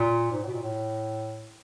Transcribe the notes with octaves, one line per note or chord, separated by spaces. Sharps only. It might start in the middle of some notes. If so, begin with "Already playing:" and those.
Already playing: A#2
G#2
A2
B2
A#2
A2